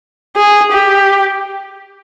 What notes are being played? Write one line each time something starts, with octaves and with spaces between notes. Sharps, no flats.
G#4
G4